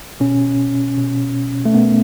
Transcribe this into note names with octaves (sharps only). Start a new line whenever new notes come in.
B2 C#4
B2
A3
B2 B3